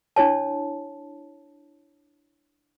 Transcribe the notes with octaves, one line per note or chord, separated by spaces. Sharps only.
D4 E4 C#5 A5